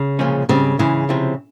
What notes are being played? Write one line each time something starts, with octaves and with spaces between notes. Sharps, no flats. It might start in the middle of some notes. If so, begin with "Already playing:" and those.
Already playing: C#3
C2 A#2 F3 G#3 C#4
G#2 C#3 G3 C4
G#2 C#3 E3 G#3 E4
C3 F3 C4 E4